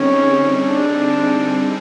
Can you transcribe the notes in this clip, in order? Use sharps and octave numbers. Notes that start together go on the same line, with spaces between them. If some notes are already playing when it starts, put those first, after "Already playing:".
Already playing: D3 G3 C4 C#4 D#4 G#4
D4